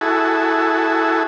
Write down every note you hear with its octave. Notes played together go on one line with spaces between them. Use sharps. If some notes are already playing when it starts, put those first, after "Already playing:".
E4 F#4 G#4 A4